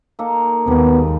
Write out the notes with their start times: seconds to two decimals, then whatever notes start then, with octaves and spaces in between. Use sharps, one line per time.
0.19 A#3 D#4 A4
0.68 D#2 G#2 G3 B3